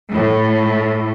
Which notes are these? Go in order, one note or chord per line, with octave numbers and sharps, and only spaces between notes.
A2